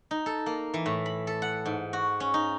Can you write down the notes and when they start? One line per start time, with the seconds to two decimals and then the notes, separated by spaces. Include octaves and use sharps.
0.11 D#4
0.26 A4
0.46 A#3
0.74 E3
0.86 A2
1.06 B5
1.27 A4
1.42 F#5
1.66 G#2
1.93 F#4
2.20 C#4
2.34 D#4